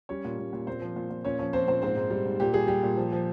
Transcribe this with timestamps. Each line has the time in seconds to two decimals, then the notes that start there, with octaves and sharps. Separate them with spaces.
0.09 G3 C#4 C#5
0.25 A#2
0.39 A#2
0.53 A#2
0.67 A#2 C4 C5
0.82 F3
0.96 A#2
1.10 A#2
1.25 A#2 C#4 C#5
1.39 F3 C#4 C#5
1.53 F3 C4 C5
1.68 A#2 C4 C5
1.82 G#2 C4 C5
1.97 G#2
2.10 G3
2.25 G#2
2.40 A#2 G4
2.54 G3 G#4
2.67 G3 G4
2.83 A#2
2.97 F3
3.12 F3